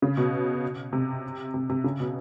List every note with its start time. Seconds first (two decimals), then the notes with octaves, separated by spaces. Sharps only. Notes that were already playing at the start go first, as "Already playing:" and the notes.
0.02 C#3
0.17 B2
0.93 C3
1.54 C3
1.69 C3
1.84 C#3
2.00 B2